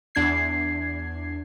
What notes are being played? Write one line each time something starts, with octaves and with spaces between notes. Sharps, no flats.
E2 D4 G#6 C7